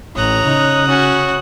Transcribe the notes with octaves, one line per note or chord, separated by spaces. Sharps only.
A1 C#5 A#5 D#6 F#6
C#3 D#4
C#4 F#4